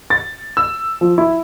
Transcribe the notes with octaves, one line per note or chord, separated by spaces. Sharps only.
A6
E6
F3
E4